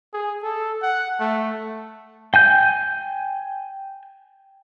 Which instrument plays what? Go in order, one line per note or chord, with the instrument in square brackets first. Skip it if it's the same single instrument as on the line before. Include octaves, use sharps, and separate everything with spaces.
[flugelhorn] G#4
A4
F#5
A3
[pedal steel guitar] G5 G#5 G6